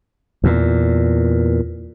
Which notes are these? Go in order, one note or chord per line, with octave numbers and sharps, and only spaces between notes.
E2 A#2